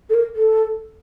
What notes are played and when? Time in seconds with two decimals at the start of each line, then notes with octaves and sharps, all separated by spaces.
0.10 A4
0.14 A#4
0.36 A4